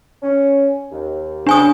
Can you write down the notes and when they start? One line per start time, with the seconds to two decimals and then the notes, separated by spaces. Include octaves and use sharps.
0.23 C#4
0.91 D#2
1.47 C#3 F#3 G3 D4 G#5 D#6